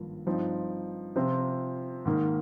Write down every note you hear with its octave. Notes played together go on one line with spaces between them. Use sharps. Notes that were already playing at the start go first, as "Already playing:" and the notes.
Already playing: G#1 G2 F3 A#3
G2 F3 C4 D#4
C3 F3 C4 F4
G#2 D#3 A#3